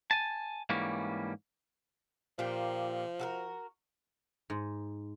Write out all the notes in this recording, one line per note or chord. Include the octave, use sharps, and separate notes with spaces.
G#5 A5
G#2 E3 G3 A#3 C#4
A#2 F3 A#3 G4
F#4 A4 A#4
G#2